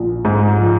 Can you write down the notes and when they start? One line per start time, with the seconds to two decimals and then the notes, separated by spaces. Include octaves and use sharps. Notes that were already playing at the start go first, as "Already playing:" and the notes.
Already playing: A#1
0.25 G#2
0.59 F3